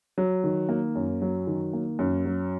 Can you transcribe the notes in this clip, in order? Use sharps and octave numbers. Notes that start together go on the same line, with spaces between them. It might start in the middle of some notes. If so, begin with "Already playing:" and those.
F#3
D#3
A#3
F#2
F#3
D#3
A#3
F#2
F#3